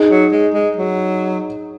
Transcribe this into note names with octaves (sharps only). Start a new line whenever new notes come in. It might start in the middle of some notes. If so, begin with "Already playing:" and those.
Already playing: D#4 G#4
F#3
G#3
G#3
F#3